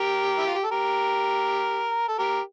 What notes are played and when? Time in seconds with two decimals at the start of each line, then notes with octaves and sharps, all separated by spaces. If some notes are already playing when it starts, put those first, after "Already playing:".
Already playing: G4 A#4
0.38 E4
0.47 F4
0.54 G4
0.64 A4
0.71 G4 A#4
2.08 A4
2.18 G4 A#4